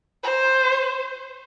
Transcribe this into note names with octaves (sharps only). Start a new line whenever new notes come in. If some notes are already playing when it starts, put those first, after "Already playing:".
C5